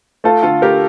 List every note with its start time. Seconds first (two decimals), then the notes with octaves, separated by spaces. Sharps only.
0.24 A3 F4 A4
0.43 D3 F4 A4
0.62 A3 G4 A#4